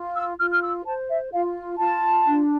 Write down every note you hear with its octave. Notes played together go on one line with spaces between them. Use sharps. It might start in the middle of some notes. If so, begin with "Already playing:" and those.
Already playing: F4
E6
F4 F6
F6
E6
C5 A5
E5
F4 F5
F4 A5
D4